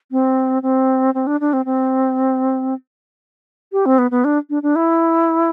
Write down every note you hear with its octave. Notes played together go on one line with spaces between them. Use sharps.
C4
C4
C4
D4
D4
C4
C4
G4
C4
B3
B3
D4
D4
D4
E4